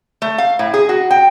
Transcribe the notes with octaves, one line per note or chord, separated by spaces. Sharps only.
A3
F5
A2
G#4
F#4
G5